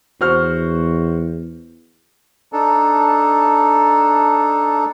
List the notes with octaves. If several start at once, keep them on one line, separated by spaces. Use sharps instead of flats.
E2 F#4 C5 F6
D4 D#4 A4